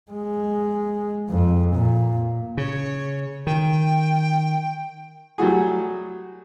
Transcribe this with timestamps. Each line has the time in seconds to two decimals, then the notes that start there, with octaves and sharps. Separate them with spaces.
0.11 G#3
1.30 F2
1.74 A#2
2.57 C#3 C#5
3.47 D#3 G5
5.38 F#3 G3 A3 F#4 G#4